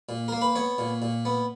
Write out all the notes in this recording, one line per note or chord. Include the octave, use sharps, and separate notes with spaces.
A#2
A#3 A#4
B4
B3 C#5
A#2
A#2
B3